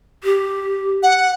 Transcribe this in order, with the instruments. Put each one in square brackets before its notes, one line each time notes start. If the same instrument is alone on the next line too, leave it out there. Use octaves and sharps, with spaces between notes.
[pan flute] G4
[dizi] F#5